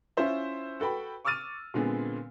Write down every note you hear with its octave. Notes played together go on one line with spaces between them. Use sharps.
C#4 E4 F4 C5 E5
F#4 A4 B4 G5 B5
C#6 D6 E6 F6 A6 D#7
A#2 D3 G#3 B3 C4